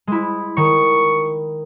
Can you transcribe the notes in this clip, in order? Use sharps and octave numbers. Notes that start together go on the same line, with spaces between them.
G#3 E4
D#3 C#6